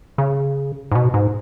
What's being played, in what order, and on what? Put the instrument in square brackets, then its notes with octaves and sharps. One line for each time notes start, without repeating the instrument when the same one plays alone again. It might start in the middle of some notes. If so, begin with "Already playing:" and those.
[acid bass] C#3
G#2
B2
G#2